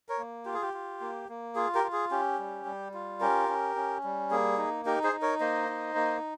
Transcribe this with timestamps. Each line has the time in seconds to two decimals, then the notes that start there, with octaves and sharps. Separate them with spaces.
0.09 A#4 C#5
0.18 A#3
0.45 F4 G4
0.54 G#4
0.62 G4
0.73 F4
1.01 A#3
1.29 A#3
1.55 F4 G#4
1.75 G4 A#4
1.84 F4
1.92 G#4
2.11 C#4 G4
2.38 G3
2.66 G3
2.94 F4
3.20 C#4 G4 A#4
3.48 C#4
3.76 C#4
4.04 G3
4.31 A#3 G#4
4.58 D#4
4.85 D#4 G4 A#4
5.03 G#4 C5
5.12 D#4
5.22 A#4 C#5
5.40 A#3 C5 D#5
5.69 D#4
5.95 A#3